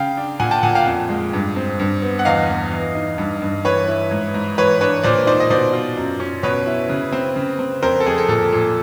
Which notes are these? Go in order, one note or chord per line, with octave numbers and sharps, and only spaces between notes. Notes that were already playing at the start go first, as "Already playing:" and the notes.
Already playing: C#3 F5 G5
D4
A#2 F#5 G#5
G5 A5
A#2 F#5 G#5
F5 G5
F2
G#3
G2
C4
G2
B3
F#5
E2 D#5 F5
E2
E3
D#4
G2
G2
E3 B4 C#5
E4
G#2
G#2
E3 B4 C#5
D4 B4 C#5
A#2 C5 D5
D#4 C5 D5
D#5
B2 C5 D5
F4
F#2
C#4
B2 B4 C#5
E4
C#3
C4
C#3
C4
F2 A#4 C5
A4
F2 G#4
A4
A#2 A4
A#2